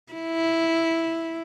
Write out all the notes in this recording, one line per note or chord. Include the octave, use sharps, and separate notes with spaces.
E4